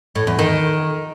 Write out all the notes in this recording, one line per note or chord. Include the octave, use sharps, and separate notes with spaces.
A2
E2
D#3